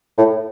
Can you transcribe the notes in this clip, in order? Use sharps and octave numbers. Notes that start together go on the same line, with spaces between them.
A2